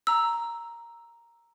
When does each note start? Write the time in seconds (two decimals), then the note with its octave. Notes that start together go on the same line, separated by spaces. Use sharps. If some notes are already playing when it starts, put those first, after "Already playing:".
0.07 A#5 E6